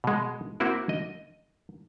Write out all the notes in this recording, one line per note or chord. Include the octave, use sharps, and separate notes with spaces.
B2 G#3
A#3 C4 E4 F#4 A#4
D#5